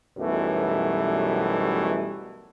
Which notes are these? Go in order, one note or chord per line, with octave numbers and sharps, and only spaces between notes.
B1 F#2 B2 E3 G3 A3